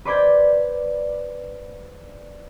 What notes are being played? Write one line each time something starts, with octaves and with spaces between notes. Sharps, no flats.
B4 C5 D5 B5 G6 G#6